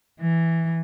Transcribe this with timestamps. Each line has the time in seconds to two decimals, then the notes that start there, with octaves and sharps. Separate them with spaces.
0.20 E3